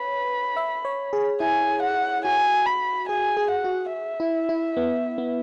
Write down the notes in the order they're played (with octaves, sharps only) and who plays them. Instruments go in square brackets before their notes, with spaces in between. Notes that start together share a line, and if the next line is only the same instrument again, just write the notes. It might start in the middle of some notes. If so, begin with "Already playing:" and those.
Already playing: [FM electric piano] B4 C#5 [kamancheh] B5
[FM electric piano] E5
C#5
G#4
[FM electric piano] E4 [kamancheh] G#5
[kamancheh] F#5
[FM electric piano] F#4 [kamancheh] G#5
[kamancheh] B5
[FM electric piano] G#4 [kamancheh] G#5
[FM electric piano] G#4
[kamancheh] F#5
[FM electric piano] F#4
[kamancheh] E5
[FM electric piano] E4
E4
B3
B3